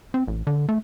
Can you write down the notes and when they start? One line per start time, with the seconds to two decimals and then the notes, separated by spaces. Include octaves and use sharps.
0.14 C4
0.28 A1
0.47 D3
0.69 A3